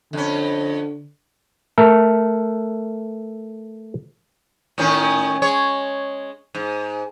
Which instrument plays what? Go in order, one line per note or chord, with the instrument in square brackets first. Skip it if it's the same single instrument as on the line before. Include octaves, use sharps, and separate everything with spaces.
[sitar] F2 C#4 [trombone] D3
[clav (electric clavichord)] A3 A4 A#4
[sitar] A2 D#3 C#4
G#3 C#5
G#2